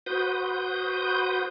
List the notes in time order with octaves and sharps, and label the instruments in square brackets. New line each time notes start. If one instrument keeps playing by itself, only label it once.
[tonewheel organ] F#4 B4 C5 D#6 G6